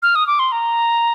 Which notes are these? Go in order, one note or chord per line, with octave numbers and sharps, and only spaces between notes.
F6
D#6
D6
C6
A#5